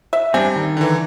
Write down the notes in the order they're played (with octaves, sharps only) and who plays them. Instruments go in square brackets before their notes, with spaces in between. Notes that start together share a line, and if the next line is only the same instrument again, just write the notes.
[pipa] E5
[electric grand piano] G3 [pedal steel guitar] C4 D4 [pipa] G#5
[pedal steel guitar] D#3
[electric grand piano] D3 E3